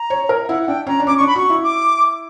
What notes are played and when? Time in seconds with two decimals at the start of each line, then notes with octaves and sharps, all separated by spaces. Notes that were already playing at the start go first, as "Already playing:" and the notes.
Already playing: A#5
0.10 C#5
0.29 A#4
0.44 E5
0.48 E4 F#5
0.62 F#5
0.68 D4 G5
0.87 C#4 A#5
1.00 D4
1.06 C#4 D6
1.17 D4 C#6
1.27 B5
1.36 F#4 C#6
1.50 E4
1.63 D6